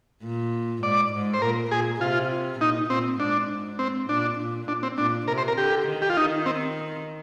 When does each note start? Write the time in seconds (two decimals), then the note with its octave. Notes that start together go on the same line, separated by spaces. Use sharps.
0.23 A#2
0.83 G#2 D5
1.12 G#2
1.34 C5
1.42 A#2 A#4
1.71 A#2 G#4
2.01 C3 F4
2.60 A#2 D#4
2.90 A#2 C4
3.19 G#2 D4
3.79 C4
4.09 A#2 D4
4.39 A#2
4.68 D4
4.83 C4
4.98 A#2 D4
5.28 C3 A#4
5.38 C5
5.48 A#4
5.57 D3 G4
5.87 D#3
6.02 G4
6.10 F4
6.17 D#3 D#4
6.46 C4